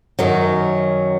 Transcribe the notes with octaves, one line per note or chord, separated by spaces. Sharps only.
F#2 D#3 F#3